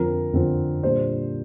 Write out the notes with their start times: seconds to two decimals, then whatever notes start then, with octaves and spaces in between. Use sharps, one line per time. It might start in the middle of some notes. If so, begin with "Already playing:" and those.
Already playing: F2 D3 F3 C4 A#4
0.33 F2 D3 F3 C4
0.83 A#2 G3 D4 C5